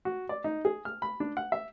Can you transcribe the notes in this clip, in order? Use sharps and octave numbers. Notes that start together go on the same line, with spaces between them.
F#4
D5
D#4
G#4
F6
B5
D4
F#5
E5